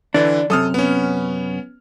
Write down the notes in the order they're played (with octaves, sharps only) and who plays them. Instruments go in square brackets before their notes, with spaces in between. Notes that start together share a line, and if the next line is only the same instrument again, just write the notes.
[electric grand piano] D3 E3 [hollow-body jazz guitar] D4
[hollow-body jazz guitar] F#2 C3 [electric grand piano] A4 D#6 F6
[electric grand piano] B3 C#4